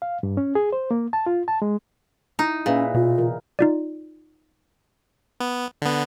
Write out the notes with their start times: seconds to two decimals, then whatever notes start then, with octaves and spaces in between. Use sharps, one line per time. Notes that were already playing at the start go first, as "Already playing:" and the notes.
0.02 F5
0.23 G2
0.37 C#4
0.55 G#4
0.73 C5
0.91 A#3
1.13 A5
1.26 F4
1.48 A5
1.62 G#3
2.39 D#4 E4
2.66 A#2 C#4 G#4 B4 E5
2.95 B2 F4
3.17 C#3 E3 A#4
3.59 D#4 F4 D5
5.40 B3
5.82 D3 B3